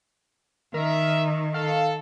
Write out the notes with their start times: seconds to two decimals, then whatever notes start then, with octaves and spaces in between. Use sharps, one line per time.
0.74 D#3 A#4 E5
1.54 A4 F5